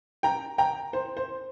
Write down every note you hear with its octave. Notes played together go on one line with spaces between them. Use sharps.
G5 A#5
G5 A#5
C5
C5